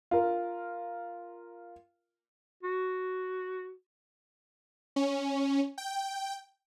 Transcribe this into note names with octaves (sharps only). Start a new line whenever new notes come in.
F4 A#4
F#4
C#4
G5